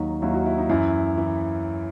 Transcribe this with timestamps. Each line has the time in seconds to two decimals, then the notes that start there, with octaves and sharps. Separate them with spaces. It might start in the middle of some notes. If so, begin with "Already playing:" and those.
Already playing: D#2 D#3 F#3 D#4
0.22 D#2 D#3 F#3 E4
0.34 F#4
0.46 E4
0.58 D#4
0.69 F#2 E3 E4
1.18 E3